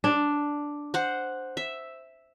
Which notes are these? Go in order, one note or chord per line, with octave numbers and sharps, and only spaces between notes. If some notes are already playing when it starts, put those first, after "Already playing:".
D4
C5 F#5
E5